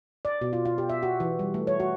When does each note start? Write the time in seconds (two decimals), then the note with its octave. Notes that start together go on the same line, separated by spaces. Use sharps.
0.25 D5
0.41 B2
0.53 F4
0.65 F4
0.78 G4
0.89 E5
1.03 F#4
1.20 E3
1.39 G3
1.54 A3
1.67 C#5
1.80 F#4